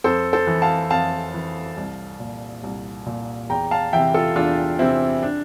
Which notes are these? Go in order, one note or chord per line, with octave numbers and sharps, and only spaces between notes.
F2 A4 C5
A4 C5
E3
F5 A5
F2 F5 A5
E3
C2
A#2
C2
A#2
E2 G5 A#5
F5 A5
C3 E3 E5 G5
F4 A4
E2 D4 F4
C3 E3 C4 E4
D4